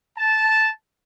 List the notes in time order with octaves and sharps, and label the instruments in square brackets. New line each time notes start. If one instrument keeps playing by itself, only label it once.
[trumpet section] A5